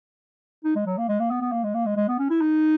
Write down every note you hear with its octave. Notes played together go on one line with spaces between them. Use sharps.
D#4
G#3
F#3
A#3
G#3
A#3
B3
B3
A#3
G#3
A#3
G#3
G#3
B3
C#4
E4
D#4